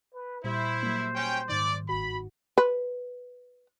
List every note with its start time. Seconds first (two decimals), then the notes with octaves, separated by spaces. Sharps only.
0.14 B4
0.44 A#2 G3 E4 C5
0.83 F#3 G3 A#3
1.15 C#4 G5
1.49 G#2 D#3 D5
1.89 G1 F#4 B5
2.58 B4